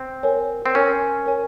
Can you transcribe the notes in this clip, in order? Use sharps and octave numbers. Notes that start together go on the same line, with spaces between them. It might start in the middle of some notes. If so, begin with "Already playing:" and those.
Already playing: C4
A#4 C#5 G#5
C4
C#4 A#4 C#5 G#5
A#4 C#5 G#5